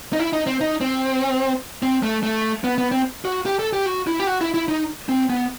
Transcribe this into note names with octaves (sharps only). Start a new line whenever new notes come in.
D#4
E4
D#4
C4
D#4
C4
C4
A3
A3
B3
B3
C4
F#4
G4
A4
G4
F#4
E4
G4
F#4
E4
E4
D#4
C4
B3